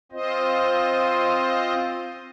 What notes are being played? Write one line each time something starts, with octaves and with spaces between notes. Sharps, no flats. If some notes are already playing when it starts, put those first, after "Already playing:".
C4 F4 C5 D#5